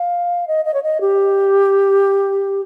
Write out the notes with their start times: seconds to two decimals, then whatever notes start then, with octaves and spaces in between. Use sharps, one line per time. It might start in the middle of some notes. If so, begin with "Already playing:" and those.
Already playing: F5
0.48 D#5
0.65 D#5
0.74 C#5
0.83 D#5
1.01 G4